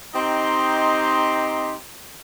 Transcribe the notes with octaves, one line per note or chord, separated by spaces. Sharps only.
C4 D#4 G4 D#5 A#5 C6